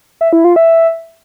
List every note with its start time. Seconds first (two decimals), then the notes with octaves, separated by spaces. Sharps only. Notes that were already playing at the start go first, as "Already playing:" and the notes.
0.21 E5
0.33 E4
0.44 F4
0.56 E5